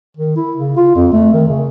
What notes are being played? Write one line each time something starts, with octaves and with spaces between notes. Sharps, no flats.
D#3
E4
C#3
F4
F2
A3
D#3
C#3